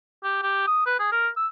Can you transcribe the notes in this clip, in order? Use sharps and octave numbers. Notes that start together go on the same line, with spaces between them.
G4
G4
D#6
B4
G#4
A#4
E6